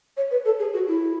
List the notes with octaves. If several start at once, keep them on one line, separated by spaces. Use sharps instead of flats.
C#5
B4
A4
G#4
F#4
E4